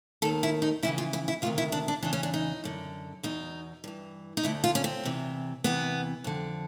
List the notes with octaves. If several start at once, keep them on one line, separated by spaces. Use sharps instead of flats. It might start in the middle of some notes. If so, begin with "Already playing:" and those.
D#2 D#3 A4
E4
D#4
F2 C#3 E3 E4
F4
E4
E4
D2 C3 D#3 F4
E4
D4
D4
E2 C#3 E3 D4
C#4
D4
D#4
F#2 D3
E2 B2 D#4
G2 E3
D#4
D2 D3 E4
F4
C#4
C4
E2 C3 E3
E2 C3 E3 B3
F2 D3